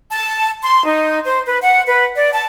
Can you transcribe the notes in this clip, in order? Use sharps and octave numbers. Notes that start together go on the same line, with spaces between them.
A5
C6
D#4
C5
B4
F#5
B4
D5
A5